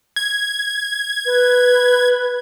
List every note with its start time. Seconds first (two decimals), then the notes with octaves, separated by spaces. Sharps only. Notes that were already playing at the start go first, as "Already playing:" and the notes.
0.16 G#6
1.26 B4